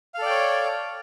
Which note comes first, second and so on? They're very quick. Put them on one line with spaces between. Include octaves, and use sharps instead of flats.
F5 A4 D5 G5 C#5